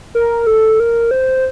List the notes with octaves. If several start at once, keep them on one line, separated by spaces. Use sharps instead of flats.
A#4
A4
A#4
C5